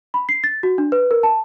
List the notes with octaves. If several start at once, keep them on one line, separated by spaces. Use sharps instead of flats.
B5
C7
A6
F#4
D4
B4
A#4
A5